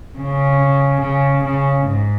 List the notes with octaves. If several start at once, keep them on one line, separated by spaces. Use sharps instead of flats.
C#3
C#3
C#3
G#2